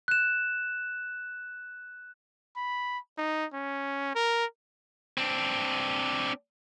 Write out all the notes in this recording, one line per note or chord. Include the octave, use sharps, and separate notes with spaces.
F#6 E7
B5
D#4
C#4
A#4
C4 D4